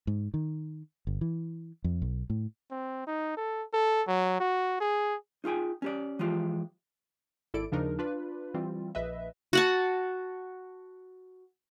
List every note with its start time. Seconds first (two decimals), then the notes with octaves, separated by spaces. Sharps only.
0.07 G#2
0.34 D#3
1.07 G1
1.21 E3
1.84 F2
2.02 B1
2.30 A2
2.71 C4
3.07 D#4
3.37 A4
3.74 A4
4.07 F#3
4.40 F#4
4.81 G#4
5.44 D#4 F4 G#4 G5 G#5
5.82 C#4 G4 D5
6.19 E3 F3 G#3 F4 G4
7.54 G#1 E4 A4 D5 D7
7.72 D#2 C#3 F3 D4 D#4 A#4
7.99 D4 F4 B4
8.54 E3 G3 C4 F4
8.95 A#1 B4 D#5 E5
9.53 F#4 F#5 A5